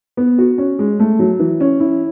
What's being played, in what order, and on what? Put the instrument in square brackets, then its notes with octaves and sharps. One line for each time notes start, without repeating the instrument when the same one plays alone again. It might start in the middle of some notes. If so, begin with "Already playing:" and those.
[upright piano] B3
F#4
C#4
G#3
A3
F#3
E3
C#4
E4